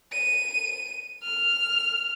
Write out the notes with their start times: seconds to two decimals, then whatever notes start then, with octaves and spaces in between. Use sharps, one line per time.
0.12 D#7
1.22 F6